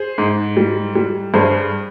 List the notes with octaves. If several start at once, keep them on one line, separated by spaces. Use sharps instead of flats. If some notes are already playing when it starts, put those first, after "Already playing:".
Already playing: G#4 C5
G#2
G3
G3
G2 G#4 C5